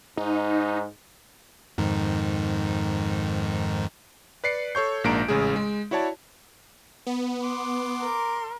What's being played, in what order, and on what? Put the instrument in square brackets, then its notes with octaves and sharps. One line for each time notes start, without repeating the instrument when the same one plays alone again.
[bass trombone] G#2 [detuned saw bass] D#4
[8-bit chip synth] F2 G#2 D#3
[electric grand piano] B4 D5 C7 C#7
A4 C#5 C#6 G6
A#1 G#2 A#3 D4 A#5 D7
A1 C#3 G#3 G#4
G#3
E4 F#4 C#5 D5 A5
[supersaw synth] B3
[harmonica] C6 D6
[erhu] A#4